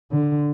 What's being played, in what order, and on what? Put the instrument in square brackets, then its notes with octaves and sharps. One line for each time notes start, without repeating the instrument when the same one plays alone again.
[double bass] D3